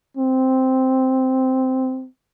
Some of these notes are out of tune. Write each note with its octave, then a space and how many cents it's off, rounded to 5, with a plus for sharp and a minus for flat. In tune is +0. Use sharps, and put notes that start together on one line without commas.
C4 -5